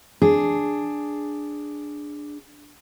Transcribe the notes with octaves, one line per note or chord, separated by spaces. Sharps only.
D4 G#4